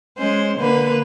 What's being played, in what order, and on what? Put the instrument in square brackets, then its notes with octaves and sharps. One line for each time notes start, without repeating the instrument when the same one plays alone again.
[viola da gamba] G#3 C#4 C5
D3 A#3 B4